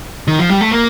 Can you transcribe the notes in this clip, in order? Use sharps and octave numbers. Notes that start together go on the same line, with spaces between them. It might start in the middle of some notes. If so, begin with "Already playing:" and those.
D#3
F3
G3
A3
A#3